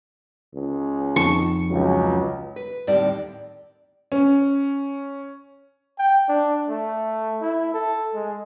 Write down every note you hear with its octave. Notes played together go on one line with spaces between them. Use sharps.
C#2
F2 D#4 A5 C#6
C#2 F#3
B4
D#2 A2 D3 G3 C4 D5
C#4
G5
D4
A3
E4
A4
G#3